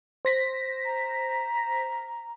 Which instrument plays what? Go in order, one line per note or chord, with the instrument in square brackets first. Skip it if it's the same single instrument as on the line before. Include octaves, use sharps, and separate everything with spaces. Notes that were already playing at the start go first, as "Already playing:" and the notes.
[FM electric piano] C5 A#6 B6
[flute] A#5